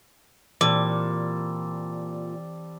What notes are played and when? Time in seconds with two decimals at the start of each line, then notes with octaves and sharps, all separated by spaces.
0.61 A#2 E3 G3 C4 A4 D6